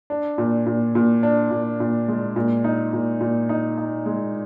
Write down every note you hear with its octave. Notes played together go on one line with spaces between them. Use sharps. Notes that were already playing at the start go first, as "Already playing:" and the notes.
D4
A#2
A#2
A#2
D4
A#2
A#2
G#3
A#2
D#4
A#2
A#2
D#4
D#4
G#3